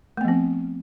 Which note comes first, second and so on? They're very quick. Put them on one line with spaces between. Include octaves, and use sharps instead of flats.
A3 B3 F3 C4